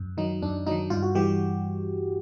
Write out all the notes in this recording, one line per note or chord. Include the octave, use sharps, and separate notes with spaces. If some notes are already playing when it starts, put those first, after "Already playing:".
Already playing: F#2
D#3 F#3 D#4
F#2 D4
D#3 F#3 D#4
G2 F4
F#4
E3 G3 G4